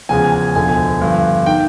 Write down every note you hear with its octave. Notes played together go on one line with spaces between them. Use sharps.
E2 C#3 F3 G#3 G#5
G#5
E1 D2 D3 F3 G#5
G2 D3 F3
D#3 G5